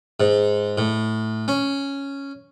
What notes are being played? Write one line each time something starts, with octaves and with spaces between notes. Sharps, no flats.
G#2
A2
C#4